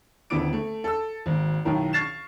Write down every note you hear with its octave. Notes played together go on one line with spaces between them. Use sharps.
D#1 D3 B3 E4 D6 D7
A3
A4 E6
G#1 A#3
B1 A2 D#3 A#4
C#6 F6 A6 C7 E7